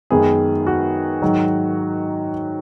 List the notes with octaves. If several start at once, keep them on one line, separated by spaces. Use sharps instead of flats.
F#2 D#3 G#3 B3 G#4
F#4
G#2 D#3 F#3